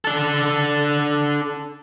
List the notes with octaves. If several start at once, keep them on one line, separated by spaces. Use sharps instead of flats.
D4 A4